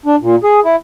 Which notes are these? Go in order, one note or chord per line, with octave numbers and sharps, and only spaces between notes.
D4
A#2
G#4
E4